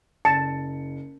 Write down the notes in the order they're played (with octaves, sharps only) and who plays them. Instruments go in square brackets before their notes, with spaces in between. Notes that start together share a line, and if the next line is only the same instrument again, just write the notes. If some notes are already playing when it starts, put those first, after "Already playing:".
[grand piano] F#1 C#7 [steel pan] A5